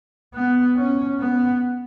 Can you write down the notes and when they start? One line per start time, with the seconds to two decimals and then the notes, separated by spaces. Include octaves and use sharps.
0.35 B3
0.77 C#4
1.19 B3